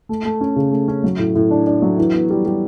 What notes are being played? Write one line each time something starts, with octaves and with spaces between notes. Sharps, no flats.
A3
A3
C#4
C#3
A3
C#4
F#3
A2
A2
D4
D4
F#3
E3
B3
G3
G3